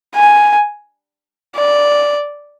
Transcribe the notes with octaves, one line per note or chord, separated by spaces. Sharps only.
G#5
D5